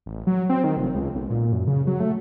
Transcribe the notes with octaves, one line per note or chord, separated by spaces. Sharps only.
A1
F#3
C4
D#3
F1
C#2
B1
A#2
F#2
C#3
F#3
A3